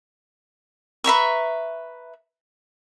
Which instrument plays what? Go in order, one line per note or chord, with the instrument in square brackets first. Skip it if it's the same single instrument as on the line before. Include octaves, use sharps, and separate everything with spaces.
[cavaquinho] B4 E5 A#5 C#6